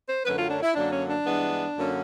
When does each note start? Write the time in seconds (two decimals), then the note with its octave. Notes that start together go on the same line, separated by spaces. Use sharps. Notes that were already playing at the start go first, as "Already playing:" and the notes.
0.09 C5
0.25 F#2 D3 F#3 A3 C#4 B4
0.38 F4
0.50 D4
0.63 E4
0.75 F#2 D3 F#3 A#3 D4
0.93 C#4
1.09 D4
1.25 G2 E3 G#3 B3
1.76 F#2 D3 F#3 A#3 C#4